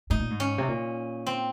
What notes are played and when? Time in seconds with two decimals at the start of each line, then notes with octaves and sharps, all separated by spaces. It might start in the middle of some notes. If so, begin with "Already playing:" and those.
0.10 G#2 D#4
0.20 A#2
0.30 G#2
0.40 C#4
0.58 C3
0.68 A#2
1.27 C4